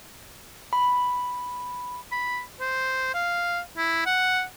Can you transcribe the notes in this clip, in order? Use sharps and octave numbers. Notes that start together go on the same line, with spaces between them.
B5
B5
C5
F5
E4
F#5